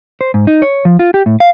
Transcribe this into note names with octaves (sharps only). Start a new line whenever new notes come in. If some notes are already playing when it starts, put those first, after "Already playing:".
C5
G#2
D#4
C#5
F3
F4
G4
A2
F5